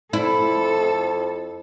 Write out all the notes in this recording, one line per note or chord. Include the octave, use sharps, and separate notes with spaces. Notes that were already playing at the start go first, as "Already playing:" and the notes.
F2 E4 A4